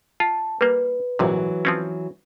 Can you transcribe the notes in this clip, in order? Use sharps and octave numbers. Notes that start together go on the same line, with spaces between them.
F4 A5
G3 A#3 B4
A#1 G#2 C3 E3 F#3 F#4
F3 C4 C#4